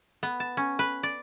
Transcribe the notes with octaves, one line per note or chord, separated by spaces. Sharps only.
B3
A5
C#4
B4
D5